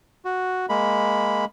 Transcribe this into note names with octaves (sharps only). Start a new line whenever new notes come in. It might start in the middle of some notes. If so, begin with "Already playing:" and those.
F#4
G#3 A#3 B5